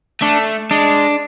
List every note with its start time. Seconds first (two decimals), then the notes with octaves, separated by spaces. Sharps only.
0.21 A3 D4
0.71 G#3 D4